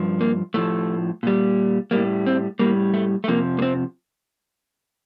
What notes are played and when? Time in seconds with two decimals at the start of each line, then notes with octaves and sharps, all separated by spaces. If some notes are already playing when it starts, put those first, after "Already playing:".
Already playing: G2 F3
0.21 A#3
0.54 A2 F3 A3
1.23 A#2 G3
1.91 A2 G3 A#3
2.26 C4
2.59 A2 G3 A#3
2.94 A3
3.24 A3
3.28 F2 C3 F3 A#3
3.59 A#3
3.62 C4